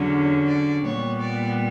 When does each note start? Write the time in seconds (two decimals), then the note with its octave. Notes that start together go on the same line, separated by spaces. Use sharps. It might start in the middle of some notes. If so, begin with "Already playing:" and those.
Already playing: E2 D3 F#3 C#4
0.47 D5
0.84 A#2 G3 B3 C#5
1.21 D5